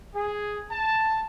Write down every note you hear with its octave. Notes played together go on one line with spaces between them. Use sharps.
G#4
A5